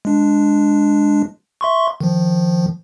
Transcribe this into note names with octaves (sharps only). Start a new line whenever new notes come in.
G#3 D4
E5 C6 C#6
D#3 F3